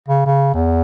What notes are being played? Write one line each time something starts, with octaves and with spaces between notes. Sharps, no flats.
C#3
C#3
E2